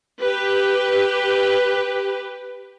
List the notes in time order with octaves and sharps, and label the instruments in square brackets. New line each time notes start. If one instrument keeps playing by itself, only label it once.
[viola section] G4 B4